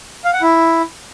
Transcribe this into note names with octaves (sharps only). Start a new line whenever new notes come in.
F5
F#5
E4